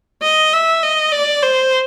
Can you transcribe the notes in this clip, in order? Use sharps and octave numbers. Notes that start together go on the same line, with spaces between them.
D#5
E5
D#5
D5
C5